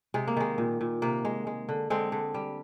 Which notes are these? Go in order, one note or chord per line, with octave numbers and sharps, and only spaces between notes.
C3 G#3
A#3
D#3 G#3
A#2
A#2
C3 A#3
G#3
G#3
D3
D3 G#3 C4
D3
G3